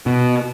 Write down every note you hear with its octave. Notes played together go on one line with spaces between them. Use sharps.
B2